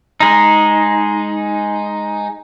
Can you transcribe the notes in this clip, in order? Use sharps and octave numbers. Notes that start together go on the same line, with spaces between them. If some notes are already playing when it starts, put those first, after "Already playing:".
G#3 D#4